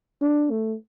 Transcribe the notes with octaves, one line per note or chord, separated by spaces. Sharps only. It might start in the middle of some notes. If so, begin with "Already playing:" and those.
D4
A3